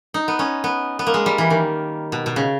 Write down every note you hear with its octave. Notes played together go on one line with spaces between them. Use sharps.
D#4
B3
C#4
B3
B3
A#3
G#3
G3
E3
D#3
B2
B2
C#3